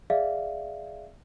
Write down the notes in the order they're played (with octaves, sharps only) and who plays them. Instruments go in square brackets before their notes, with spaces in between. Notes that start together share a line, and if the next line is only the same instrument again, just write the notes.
[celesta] G#4 D5 E5 F5